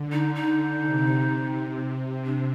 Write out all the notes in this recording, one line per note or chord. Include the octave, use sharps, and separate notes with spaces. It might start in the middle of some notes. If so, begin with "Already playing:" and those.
Already playing: D3
D#4
D#4
C3
C3
D4